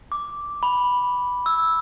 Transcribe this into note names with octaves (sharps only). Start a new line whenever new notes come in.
D6
B5
E6